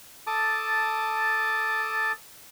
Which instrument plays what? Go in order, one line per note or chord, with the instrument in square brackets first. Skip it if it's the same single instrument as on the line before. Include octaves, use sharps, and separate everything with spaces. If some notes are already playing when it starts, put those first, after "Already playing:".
[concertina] A4 A5 D6 D#6